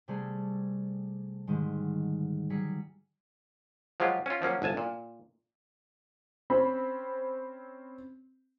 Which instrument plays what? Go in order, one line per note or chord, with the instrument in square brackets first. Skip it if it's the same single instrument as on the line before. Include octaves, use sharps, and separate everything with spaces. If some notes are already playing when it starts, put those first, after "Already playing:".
[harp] C3 G3 A3 D4 G#4 A4
G#2 D3 D#3 G3 G#3
F#3 G3 G#4 B6 C#7
[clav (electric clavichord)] F3 F#3 G#3 F4 G4
C#4 F4
F3 F#3 A#3 C#4
G1 C2 G#5 A5
A#2
[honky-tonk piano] C4 C#4 B5